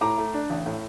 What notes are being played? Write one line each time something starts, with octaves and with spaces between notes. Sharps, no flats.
A2 A#5 D6
A3
D4
A1
A2